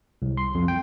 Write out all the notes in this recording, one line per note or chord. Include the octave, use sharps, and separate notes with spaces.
C2
C6
F2
G5